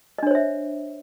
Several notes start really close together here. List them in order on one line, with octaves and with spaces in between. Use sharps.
D#5 D4 C#5 C5 E5